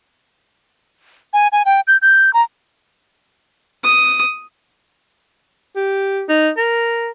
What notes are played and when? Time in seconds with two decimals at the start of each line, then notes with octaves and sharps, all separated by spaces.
1.33 G#5
1.52 G#5
1.65 G5
1.87 G6
2.02 G6
2.34 A#5
3.84 D#6
5.76 G4
6.29 D#4
6.57 A#4